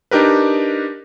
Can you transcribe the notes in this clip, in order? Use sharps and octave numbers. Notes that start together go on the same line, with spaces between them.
D4 D#4 G4 A#4 B4